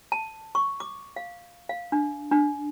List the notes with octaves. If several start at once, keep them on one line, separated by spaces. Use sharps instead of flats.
A5
C#6
D6
F5
F5
D4
D4